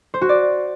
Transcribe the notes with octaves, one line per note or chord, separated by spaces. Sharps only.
C5
F#4
D5